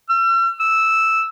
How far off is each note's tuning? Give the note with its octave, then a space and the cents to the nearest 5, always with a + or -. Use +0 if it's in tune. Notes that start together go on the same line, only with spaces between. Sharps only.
E6 +45
E6 -5